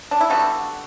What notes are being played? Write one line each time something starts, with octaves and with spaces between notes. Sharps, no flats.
D4
E4
D3 G3 B3 F#4